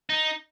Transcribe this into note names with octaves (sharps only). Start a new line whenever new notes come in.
D#4